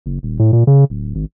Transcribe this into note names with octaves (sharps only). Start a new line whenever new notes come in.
F#1
D#1
A2
A#2
C#3
D1
G#1